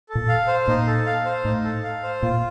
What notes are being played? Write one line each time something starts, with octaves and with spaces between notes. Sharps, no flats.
A4
A#2
F5
C5
A#2 D#4
A4
F5
C5
A2 D#4
A4
F5
C5
A#2 F4